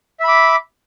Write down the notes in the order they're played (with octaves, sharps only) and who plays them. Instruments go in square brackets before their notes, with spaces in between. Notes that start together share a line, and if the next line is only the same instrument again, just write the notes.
[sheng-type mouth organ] E5
B5
D6